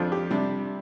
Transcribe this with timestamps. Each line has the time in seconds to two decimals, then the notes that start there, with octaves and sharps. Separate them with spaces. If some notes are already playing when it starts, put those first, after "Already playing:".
Already playing: F2 F3 D4 F4
0.12 G4
0.30 C3 G3 D4